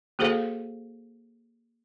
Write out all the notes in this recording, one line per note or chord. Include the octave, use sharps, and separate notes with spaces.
A#3 F#4 G#4 A4 C5 F5